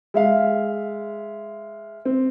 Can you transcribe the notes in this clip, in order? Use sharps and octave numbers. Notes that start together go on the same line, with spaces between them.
G#3 E5 F5
C4